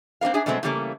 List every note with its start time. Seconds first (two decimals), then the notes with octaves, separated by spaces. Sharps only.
0.21 A#3 C4 D4 A#4 F5
0.34 D4 G#4 C#5 E5 G#5
0.46 B2 F#3 G#3 A3 C4
0.63 C#3 E3 G3 A3 A#3 C#4